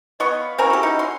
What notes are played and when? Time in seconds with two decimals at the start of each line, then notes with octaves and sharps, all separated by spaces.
0.20 B3 C#5 D#5 C#6
0.40 F5 B5
0.58 C4 C#4 E4 F#4 A#4 G#5
0.70 G4 A4
0.83 D#4
0.99 C6